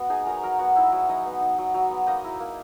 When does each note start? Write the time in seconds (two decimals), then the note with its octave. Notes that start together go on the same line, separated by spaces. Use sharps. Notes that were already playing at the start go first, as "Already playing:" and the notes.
Already playing: B3 F#4 F#5
0.09 D#4 G#4 G#5
0.26 F#3 A#4 A#5
0.43 F#3 A#4 A#5
0.58 B3 F#4 F#5
0.75 D#4 E4 E5
0.92 F#3
1.08 F#3 D#4 D#5
1.25 B3
1.41 D#4
1.58 F#3
1.74 F#3
1.91 B3
2.07 A#3 D#4 D#5
2.24 E4
2.40 A#3